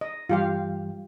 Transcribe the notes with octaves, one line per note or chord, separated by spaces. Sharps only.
D#5
G2 E3 G3 F4 G4 F5